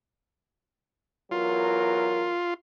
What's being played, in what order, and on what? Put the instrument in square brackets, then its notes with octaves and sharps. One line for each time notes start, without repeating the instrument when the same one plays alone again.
[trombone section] E2 F#3 A#4 [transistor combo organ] F4